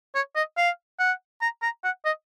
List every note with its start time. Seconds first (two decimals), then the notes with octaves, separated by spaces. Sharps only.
0.15 C#5
0.36 D#5
0.57 F5
0.99 F#5
1.41 A#5
1.62 A#5
1.84 F#5
2.05 D#5